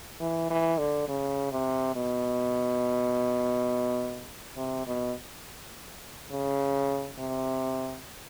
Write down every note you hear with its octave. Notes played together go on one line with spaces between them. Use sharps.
E3
E3
D3
C#3
C3
B2
C3
B2
C#3
C3